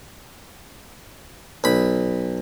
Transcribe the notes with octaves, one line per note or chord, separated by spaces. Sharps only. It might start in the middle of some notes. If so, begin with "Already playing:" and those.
B1 B5